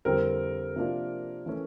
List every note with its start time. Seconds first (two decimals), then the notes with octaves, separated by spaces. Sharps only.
0.05 F2 D3 G3 C4 E4 A#4
0.76 C3 F3 A#3 D4 F4
1.46 E3 A3 C#4